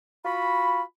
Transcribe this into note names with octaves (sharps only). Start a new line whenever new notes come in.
F4 F#4 B5